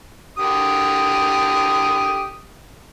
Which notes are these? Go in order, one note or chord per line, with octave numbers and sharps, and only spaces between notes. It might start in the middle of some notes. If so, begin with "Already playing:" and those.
D3 G4 D#6